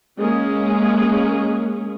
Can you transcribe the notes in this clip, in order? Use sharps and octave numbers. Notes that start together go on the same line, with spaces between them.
G#3 A#3 C#4 G#4